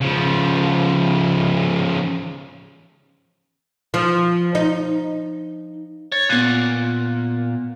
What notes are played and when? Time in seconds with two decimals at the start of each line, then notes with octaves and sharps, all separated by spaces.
0.01 C#3 F3
3.94 F3
4.55 D#4
6.12 C#5 A6
6.29 A#2 B3 F#6